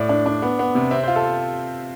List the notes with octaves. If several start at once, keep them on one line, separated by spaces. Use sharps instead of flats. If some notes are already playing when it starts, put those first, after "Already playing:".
Already playing: A2 D5
D4
D4
B3
B3
C3
C4 E5
F4 C5
A4